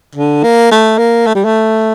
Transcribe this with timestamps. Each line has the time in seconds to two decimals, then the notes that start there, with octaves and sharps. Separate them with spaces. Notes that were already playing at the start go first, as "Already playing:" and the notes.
0.15 D3
0.43 A#3
0.71 A3
0.98 A#3
1.27 A3
1.35 G3
1.45 A3